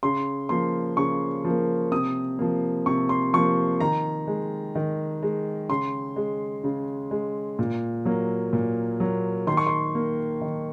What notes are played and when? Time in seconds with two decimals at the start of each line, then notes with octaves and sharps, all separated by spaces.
0.03 C#3 C6
0.49 F3 A#3 C6
0.97 C#3 C#6
1.44 F3 A#3
1.92 C3 D#6
2.39 F3 A#3
2.86 C3 C#6
3.09 C6
3.33 F3 C#6
3.37 A#3
3.80 D#3 A#5
4.28 G#3
4.75 D#3
5.23 G#3
5.69 C#3 C6
6.16 G#3
6.64 C#3
7.11 G#3
7.59 A#2
8.05 F#3 A#3
8.53 A#2
9.00 F#3 A#3
9.47 D#3 C6
9.57 C#6
9.67 C6
9.95 A#3
10.41 D#3